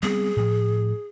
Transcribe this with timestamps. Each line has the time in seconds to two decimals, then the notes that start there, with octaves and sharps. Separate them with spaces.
0.03 G3 B3 C4 G#4
0.37 A2 F3